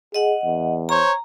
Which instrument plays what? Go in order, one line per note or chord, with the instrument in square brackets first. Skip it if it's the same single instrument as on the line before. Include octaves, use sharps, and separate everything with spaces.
[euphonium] G#4 [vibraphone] D#5 F#5
[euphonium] E2
[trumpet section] C5 C#5 [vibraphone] A#5